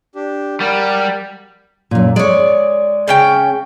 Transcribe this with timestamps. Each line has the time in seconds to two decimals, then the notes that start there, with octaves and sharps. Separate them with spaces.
0.15 D4 G4
0.60 G3 A#4 F#5
1.91 F#2 A#2
2.16 G#3 C#5 D5
3.08 C#3 C#4 G5